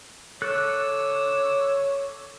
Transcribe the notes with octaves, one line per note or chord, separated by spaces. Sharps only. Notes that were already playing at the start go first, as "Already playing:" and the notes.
A4 C#5 D6 E6 F#6